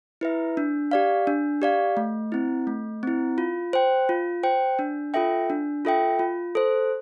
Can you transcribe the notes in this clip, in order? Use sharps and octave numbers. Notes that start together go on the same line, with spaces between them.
E4 B4 E5
D4
G4 D5 F5
D4
G4 D5 F5
A3
C4 E4
A3
C4 E4
F4
C5 G5
F4
C5 G5
D4
F4 A4 E5 G5
D4
F4 A4 E5 G5
F4
A4 C5